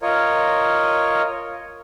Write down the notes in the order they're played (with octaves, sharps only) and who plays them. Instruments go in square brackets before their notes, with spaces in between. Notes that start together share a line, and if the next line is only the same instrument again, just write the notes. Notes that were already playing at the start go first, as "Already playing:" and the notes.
[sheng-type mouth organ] F4 A#4 C#5 D#5